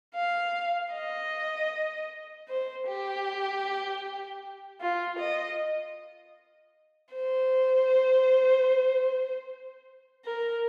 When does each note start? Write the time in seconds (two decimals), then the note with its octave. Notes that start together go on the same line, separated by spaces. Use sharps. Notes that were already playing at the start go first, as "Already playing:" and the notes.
0.15 F5
0.94 D#5
2.49 C5
2.87 G4
4.81 F4
5.19 D#5
7.15 C5
10.25 A#4